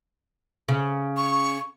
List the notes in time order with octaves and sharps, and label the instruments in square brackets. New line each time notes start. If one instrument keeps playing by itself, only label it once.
[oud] C#3
[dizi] C#6